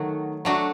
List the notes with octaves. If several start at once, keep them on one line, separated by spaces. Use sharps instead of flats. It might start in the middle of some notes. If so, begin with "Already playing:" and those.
Already playing: D#3 F#3 A3 F#4
F#3 A3 D4 F#4